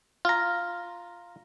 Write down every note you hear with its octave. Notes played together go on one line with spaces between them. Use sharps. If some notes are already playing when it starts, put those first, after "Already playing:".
F4 A#5